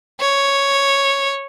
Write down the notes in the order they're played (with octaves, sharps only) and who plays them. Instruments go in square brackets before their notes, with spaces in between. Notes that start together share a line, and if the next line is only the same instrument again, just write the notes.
[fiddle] C#5